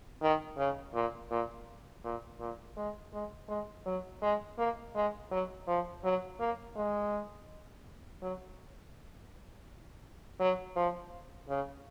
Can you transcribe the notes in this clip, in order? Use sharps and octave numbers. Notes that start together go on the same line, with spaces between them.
D#3
C#3
A#2
A#2
A#2
A#2
G#3
G#3
G#3
F#3
G#3
A#3
G#3
F#3
F3
F#3
A#3
G#3
F#3
F#3
F3
C#3